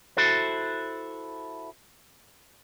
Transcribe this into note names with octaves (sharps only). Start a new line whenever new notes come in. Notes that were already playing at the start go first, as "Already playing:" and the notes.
E4 F#4 A4 C5